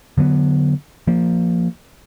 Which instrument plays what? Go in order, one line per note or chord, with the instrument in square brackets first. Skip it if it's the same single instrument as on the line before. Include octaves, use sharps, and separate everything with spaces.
[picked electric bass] D3 F#3 B3
F3 A#3